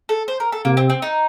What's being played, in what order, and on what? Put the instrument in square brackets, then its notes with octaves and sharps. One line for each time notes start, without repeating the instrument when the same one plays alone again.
[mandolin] A4
C5
A#4
A4
[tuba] C3 [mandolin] A#3
[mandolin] C4
C4
D#4